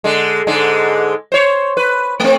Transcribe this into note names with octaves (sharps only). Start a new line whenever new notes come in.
D3 G#3
G#2 D3 G#3
C5 C#5
B4
A3 C4